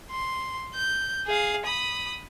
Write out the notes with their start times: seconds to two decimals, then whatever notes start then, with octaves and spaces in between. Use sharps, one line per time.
0.11 C6
0.74 G6
1.27 G#4 F5
1.65 B5 D#6